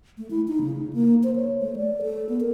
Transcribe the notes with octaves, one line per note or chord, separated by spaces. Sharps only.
A3
E4
D#4
C#3
A#3
C5
C#5
A3
D5
A4
B3
A#4